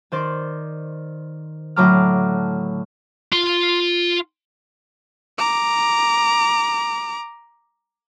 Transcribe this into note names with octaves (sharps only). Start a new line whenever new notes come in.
D#3 C5 D5
A2 D3 F#3 A#5 D6 F6
F4 C6
A#5 D6